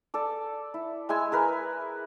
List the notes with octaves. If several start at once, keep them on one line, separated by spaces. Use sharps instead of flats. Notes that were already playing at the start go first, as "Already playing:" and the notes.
A4 D5
E4
G#3 E4 G#5 E6
G#4 A#4 B4